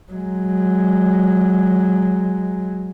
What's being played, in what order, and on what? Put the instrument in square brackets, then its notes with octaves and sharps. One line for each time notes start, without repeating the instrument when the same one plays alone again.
[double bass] F#3 G#3